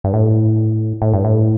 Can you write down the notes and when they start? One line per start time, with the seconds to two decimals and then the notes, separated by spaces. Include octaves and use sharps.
0.04 G2
0.14 A2
1.02 A2
1.14 G2
1.25 A2